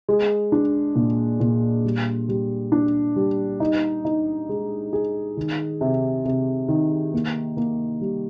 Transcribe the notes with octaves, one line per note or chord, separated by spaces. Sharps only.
G#3
D4
A#2
A#2
G3
G3
D4
G3
D#4
D#4
G#3
G#4
D#3
C3
C3
D#3
A#3
A#3
G3